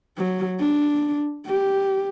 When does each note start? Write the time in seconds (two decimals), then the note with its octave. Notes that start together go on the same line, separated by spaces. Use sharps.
0.18 F#3
0.60 D4
1.47 G4